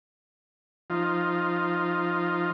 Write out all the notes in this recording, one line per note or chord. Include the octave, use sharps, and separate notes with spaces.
F3 D#4 F4